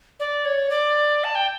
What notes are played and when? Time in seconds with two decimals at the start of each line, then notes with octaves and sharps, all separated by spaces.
0.20 D5
0.45 C#5
0.70 D5
1.24 A5
1.35 G5